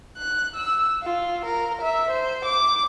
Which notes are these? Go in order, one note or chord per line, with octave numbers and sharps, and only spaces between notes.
F#6
E6
F4
A#4
E5
C5
D6